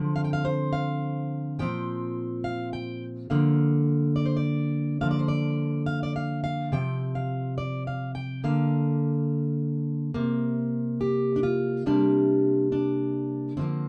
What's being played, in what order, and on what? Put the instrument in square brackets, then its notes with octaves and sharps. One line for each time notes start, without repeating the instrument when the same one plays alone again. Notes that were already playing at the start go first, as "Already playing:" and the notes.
Already playing: [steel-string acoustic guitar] D3 F3 C4
F5
G5
F5
C5
F5
A#2 F3 C4 G5
F5
G5
D3 F3 A#3 F5
D5
C5
D5
D3 F3 A#3 F5
D5
C5
D5
F5
D5
F5
F5
C3 F3 C4 G5
F5
D5
F5
G5
D3 A#3 F5
C3 A#3
G4
D4
F4
C3 G3 A#3 D4
D4
D3 F3 A#3 C4